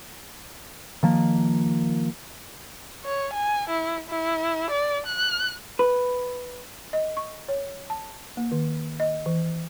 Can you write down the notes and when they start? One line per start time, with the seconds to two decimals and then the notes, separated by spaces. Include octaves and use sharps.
1.03 D#3 F3 A#3
3.05 C#5
3.34 G#5
3.69 E4
4.09 E4
4.70 D5
5.06 F#6
5.79 B4
6.93 D#5
7.17 C#6
7.49 C#5
7.90 A5
8.37 A#3
8.52 D#3
9.00 D#5
9.26 E3